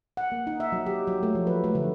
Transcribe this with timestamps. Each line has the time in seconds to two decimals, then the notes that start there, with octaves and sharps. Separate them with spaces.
0.17 F#5
0.32 A#3
0.47 D#4
0.60 E5
0.72 F#3
0.86 G4
1.07 F#3
1.23 A3
1.35 F3
1.47 B4
1.64 A3
1.75 D3